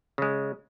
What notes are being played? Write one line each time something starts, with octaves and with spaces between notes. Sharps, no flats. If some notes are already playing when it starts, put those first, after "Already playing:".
C#3 G#3